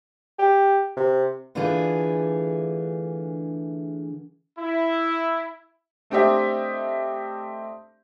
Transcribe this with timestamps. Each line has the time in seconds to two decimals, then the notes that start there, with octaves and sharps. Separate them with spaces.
0.39 G4
0.96 C3
1.55 D3 E3 A3 D4 F4 G#4
4.58 E4
6.10 A3 C4 D4 G4 D#5 E5